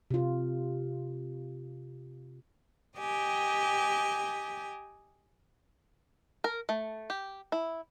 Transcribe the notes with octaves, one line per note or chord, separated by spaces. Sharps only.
C3 F4
G4 D#5 G5 G#5
A#4
A3
G4
E4